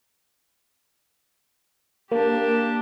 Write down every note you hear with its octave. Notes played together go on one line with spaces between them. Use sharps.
A#3 D4 G4